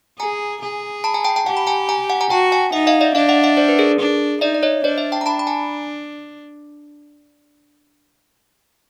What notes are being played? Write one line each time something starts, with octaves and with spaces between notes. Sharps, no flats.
G#4 G#5 A#5
G#4
A5 B5
G#5 A#5
G5 A5
G5 A5
G4 F#5 G#5
B5
G#5 A#5
G#5 A#5
F#5 G#5
G#5 A#5
F#4 G5 A5
F#5 G#5
D#4 E5 F#5
D#5 F5
D5 E5
D4 D#5 F5
E5 F#5
E5 F#5
C5 D5
B4
G#4 A#4
D4
D#4 D5 E5
D5
C#5 D#5
D4 C5 D5
D5 E5
G5 A5
A#5
D4 A5 B5
B5
G#5 A#5